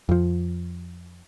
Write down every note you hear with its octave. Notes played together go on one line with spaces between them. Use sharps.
F2 F3